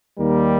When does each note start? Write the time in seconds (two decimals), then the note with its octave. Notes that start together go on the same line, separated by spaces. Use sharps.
0.19 D#2 D#3 G3 A#3 A#4